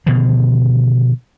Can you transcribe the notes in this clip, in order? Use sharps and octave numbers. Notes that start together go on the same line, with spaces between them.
B2 D3 D#3 F3